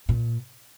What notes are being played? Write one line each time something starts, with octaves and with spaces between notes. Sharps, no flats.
A#2